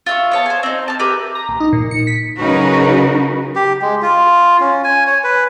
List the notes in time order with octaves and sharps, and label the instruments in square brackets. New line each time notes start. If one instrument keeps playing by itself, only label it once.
[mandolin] F4 E5 C#6
B3 C#5 A5
C5 G#5
C4 D#4
A5 F6
G4 A#4 B4 E5
[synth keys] A#5
A#1
D#4
A#2
C#7
B6
[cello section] C#3 F#3 D#4 F#4 A#4 B4
[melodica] G4
G#3
F4
C#4
G#5
C#5
B4